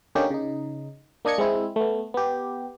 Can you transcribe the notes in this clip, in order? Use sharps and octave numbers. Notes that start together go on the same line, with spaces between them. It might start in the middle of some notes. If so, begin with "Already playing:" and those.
D3 A#3 C#4 D#4 G4
C#3 D#4
A#3 D4 D#5 G#6 C#7
G#3 C4 E4
A3 B3
B3 G4